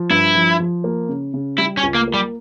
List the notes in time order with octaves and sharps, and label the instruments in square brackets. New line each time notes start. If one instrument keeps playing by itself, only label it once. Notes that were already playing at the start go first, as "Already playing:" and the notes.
Already playing: [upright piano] F3
[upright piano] G2 [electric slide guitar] E4
[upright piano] F3
F3
A#3
C#3
C#3
[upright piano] G3 [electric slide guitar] E4
[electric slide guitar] C#4
[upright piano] C#2
[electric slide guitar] A#3
[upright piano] A#3
[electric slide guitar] G3